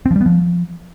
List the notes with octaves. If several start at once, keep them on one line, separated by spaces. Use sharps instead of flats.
C4
F3
G3
B3
F3